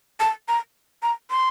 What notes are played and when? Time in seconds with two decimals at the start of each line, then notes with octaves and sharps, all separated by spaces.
0.20 A5
0.48 A#5
1.03 A#5
1.31 C6